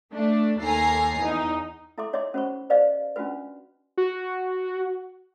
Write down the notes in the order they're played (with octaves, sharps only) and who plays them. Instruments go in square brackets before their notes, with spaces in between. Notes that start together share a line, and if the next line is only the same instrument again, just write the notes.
[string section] A3 D4
D#2 A4 G#5 A#5 C7
E2 D#4
[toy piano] E4 A4 E5 C6 D6
D#4 C#5 D#5 E5 C6 D6
C#4 F#4 C5 B5 C#6
G4 B4 C5 D5 D#5 F5
C#4 D4 F4 F#4 B4
[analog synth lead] F#4